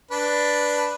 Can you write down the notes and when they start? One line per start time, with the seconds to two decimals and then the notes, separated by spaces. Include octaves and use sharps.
0.11 D4 B4